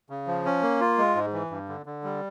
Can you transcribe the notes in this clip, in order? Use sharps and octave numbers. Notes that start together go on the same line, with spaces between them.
C#3
F3
C#4
A#3
F4
G#3
G#2
E3
G2
D3
D3
G3